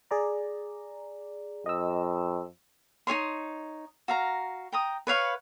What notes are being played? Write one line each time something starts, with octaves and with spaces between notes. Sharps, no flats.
G#4 D5 A#5
F2 D#5 E6
D#4 G#4 C#5 C6
F#4 F5 A#5
G5 A#5 D#6
B4 C#5 F5 C#6